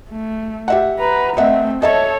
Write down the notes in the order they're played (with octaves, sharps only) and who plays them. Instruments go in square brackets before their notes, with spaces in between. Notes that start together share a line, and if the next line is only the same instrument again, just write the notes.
[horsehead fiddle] A3
[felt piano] G4 E5 F#5
[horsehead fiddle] B4 A#5
[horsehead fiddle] A3 C4 [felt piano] D#5 E5 F#5
[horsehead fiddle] A4 C#5 [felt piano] D#5 E5 A5